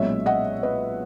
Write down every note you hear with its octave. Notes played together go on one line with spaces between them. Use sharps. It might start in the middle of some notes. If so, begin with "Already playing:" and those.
Already playing: B1 A#2 G#3 C#4 C#5 E5
D#5 F#5
B4 D#5